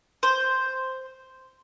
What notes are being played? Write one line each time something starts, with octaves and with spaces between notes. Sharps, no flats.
C5